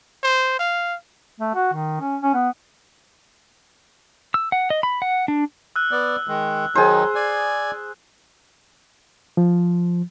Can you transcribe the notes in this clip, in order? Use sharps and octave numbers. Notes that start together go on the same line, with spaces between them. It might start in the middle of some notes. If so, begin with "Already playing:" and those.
C5
F5
A3
F#4
D#3
C#4
C#4
B3
E6
F#5
D#5
B5
F#5
D4
E6 F#6
B3 D5
D#3 G#3
D#3 F#3 D#4 G#4 C5
D5 G#5
F3